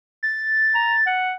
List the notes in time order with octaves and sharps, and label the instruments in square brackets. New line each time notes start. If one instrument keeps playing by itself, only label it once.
[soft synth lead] A6
[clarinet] A#5
F#5